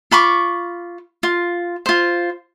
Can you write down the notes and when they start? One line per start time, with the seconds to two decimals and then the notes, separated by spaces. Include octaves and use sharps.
0.11 F4 B5 C#6 D6
1.23 F4
1.86 F4 C5